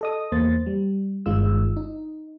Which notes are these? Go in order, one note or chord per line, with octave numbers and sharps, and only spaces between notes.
A4 D#5 D#6
E2 A#3 C5 A6
G3
G1 D#3 G#3 F4 E6
D#4